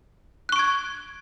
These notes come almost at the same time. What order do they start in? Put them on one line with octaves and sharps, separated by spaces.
F#6 C#6 D7 G#6